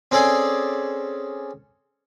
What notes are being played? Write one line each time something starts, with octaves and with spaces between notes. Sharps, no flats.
C4 C#4 G#4 A4 D5 G#5